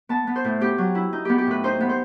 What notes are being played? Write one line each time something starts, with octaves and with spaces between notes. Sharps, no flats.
B3 A5
B3
C5
A2
B3 G4
F#3
E4
D#4
B3 G4
G4
A2 B4
D#4 C5
B3
C5